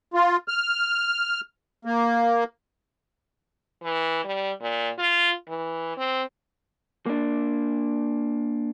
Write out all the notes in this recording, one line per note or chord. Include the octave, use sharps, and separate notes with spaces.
F4
F6
A#3
E3
G3
A#2
F4
E3
C4
A#3 D4